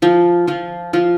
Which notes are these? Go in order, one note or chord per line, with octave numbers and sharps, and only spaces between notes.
F3 F4
F3 F4
F3 F4